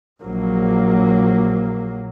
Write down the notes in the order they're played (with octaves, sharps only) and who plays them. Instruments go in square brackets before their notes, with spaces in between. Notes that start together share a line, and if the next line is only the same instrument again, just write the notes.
[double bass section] A#1 F#3 A#3